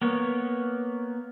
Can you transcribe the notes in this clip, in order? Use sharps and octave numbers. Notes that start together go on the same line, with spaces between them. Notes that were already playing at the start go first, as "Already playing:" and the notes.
A#3 B3 C#5